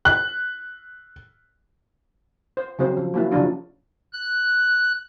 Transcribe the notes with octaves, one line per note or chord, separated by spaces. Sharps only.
F#6
C5
C#3 F#3 C4 C5
F3
F#3 A#3 E4
C#3 F3 F#3 D4 F4
F#6